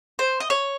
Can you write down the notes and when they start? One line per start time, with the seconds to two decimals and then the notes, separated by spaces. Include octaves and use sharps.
0.19 C5
0.40 D#5
0.50 C#5